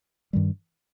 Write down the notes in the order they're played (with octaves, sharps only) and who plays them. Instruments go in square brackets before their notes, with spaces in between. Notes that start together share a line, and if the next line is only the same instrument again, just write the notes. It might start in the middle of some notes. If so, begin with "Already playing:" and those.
[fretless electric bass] G2 D#3 G3